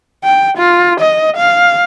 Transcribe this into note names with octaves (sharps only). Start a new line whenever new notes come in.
G5
F4
D#5
F5